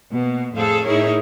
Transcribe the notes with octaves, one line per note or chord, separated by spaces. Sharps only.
B2 A#3
F2 A2 G#4 A4 C5 F5
A2 D#4 E4 G#4 A#4 C#5